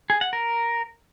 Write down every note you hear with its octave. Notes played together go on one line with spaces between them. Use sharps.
G#4
F#5
A#4